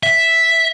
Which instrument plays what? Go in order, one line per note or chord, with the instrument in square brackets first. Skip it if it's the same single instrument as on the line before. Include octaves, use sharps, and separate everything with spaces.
[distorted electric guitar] E5